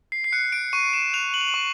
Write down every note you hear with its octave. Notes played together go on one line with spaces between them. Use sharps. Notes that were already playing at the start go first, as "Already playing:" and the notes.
C7
C7
F#6 C#7
D7
C#6 D#7
E7
F#6 F7
F#7
F7
F#7
C#6